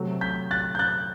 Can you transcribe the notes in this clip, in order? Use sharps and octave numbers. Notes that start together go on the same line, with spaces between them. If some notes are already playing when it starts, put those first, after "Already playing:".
Already playing: C3 F#3 A3
G6 B6
F#6 A6
G6
F#6 A6